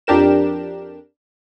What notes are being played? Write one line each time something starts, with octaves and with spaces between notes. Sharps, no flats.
F2 D4 G4 A#4 E7